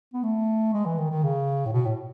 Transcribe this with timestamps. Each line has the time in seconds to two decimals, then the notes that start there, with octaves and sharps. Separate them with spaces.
0.14 B3
0.23 A3
0.73 G#3
0.85 E3
0.98 D#3
1.10 D#3
1.23 C#3
1.65 A2
1.73 B2
1.85 A2